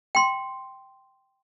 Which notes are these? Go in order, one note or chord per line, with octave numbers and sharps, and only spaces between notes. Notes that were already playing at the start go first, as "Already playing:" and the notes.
G5 C6